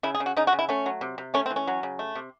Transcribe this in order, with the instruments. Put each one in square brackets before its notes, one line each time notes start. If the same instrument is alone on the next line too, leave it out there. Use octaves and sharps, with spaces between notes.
[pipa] C#3 E4
G#4
C#3
F#4
C#3 D#4
F#4
C#3
E4
A3 C#4
F#3
C3
C3
A3 C#4
C4
E3
C#4
F#3
C#3
A3
C3